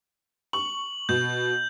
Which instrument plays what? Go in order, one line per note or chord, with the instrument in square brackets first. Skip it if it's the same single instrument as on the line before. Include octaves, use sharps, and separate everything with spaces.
[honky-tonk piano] C#6 [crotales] F#7
[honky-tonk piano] B2 [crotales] G6